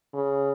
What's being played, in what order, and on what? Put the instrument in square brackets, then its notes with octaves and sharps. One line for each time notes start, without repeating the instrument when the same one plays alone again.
[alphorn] C#3